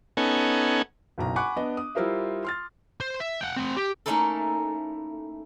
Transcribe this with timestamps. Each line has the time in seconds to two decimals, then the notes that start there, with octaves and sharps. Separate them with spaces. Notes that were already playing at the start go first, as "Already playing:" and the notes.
0.17 B3 C#4 D#4 A4 F#5 G#5
1.18 F#1 B1 A#5
1.36 F#5 G#5 B5 C#6 D6 F#6
1.56 B3 D4 D#5
1.77 D#6
1.95 G3 E4 F4 A#4 C5 E5
2.45 C6 F6 A6
3.00 C5
3.20 E5
3.41 F#5 G5
3.56 C4 F#5
3.77 G4
4.06 A3 A#3 C#4 D#4 E4 A4